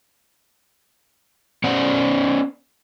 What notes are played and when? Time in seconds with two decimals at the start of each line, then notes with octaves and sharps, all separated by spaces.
1.64 B3 C#4 C5 D5 F#5